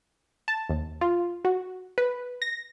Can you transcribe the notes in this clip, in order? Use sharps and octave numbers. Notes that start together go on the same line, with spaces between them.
A5
D#2
F4
F#4
B4
A#6